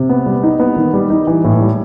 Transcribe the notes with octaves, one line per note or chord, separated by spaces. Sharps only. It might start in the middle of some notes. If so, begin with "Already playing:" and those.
Already playing: C3
B3
G3
D#4
B3
D#3
G3
D#4
E3
A2
G3